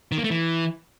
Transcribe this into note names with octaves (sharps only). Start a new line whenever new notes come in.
D#3
A#3
A3
E3